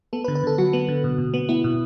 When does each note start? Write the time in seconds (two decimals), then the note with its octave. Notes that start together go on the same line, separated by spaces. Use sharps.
0.13 B3 A4
0.24 B4
0.28 D3
0.35 B4
0.44 D3 A4
0.58 F#3 F#4
0.73 B3
0.88 D3
1.04 B2
1.18 B2
1.34 B3
1.49 B3 E4
1.64 B2